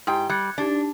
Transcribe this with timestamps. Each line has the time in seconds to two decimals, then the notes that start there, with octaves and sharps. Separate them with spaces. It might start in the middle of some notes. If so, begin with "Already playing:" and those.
0.07 G#2 E4 G4 G5
0.29 G3 F#6 G#6 C#7
0.58 D4 D#4 G4 A6